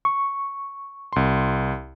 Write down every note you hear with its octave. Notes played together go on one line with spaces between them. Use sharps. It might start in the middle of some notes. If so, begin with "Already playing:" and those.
C#6
C2 C6